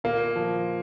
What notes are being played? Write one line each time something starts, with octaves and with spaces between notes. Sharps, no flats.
A#2 A#3
F3